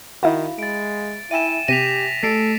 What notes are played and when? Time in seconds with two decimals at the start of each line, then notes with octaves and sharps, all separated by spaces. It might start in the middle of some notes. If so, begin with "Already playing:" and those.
0.23 D#3 E4 F#4 E5 F5 B5
0.59 G#3 A6 D7
1.31 E4 E5 G5 G#5 D#7 E7
1.68 C3 G4 A#6 B6 D#7 F7
2.23 A3 A4 A6 C7 D7